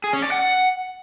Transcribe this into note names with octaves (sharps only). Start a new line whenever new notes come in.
G#4
C#4
D5
F#5